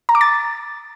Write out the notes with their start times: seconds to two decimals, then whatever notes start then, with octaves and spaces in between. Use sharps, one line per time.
0.09 A#5
0.15 D6
0.21 A6